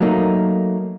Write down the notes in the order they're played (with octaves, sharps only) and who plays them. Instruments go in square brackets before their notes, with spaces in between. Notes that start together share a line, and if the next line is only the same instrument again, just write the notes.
[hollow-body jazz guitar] F#3 A3 A#3 D#4